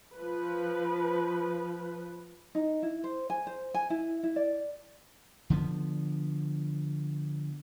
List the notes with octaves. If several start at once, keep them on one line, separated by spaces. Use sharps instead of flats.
F3 B4
D#4
E4
C5
G#5
C5
G#5
E4
E4
D5
D3 F3 B3